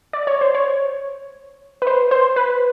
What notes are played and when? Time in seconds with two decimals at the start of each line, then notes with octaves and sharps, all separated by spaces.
0.13 D5
0.27 C#5
0.41 C5
0.55 C#5
1.82 B4
1.87 C5
2.11 C5
2.36 B4